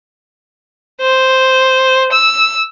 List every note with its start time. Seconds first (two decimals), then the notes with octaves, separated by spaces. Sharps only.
1.01 C5
2.12 E6